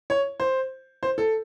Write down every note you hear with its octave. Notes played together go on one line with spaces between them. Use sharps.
C#5
C5
C5
A4